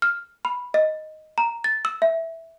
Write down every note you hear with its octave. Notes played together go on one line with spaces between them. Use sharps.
F6
B5
D#5
A#5
A6
E6
E5